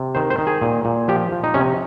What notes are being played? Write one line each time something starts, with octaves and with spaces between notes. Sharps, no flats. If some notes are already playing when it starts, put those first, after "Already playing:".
Already playing: C3
D#3 C5
C5
D#3
G#4
A#2
A#2
F3 G4
F3
D#4
C3 C#4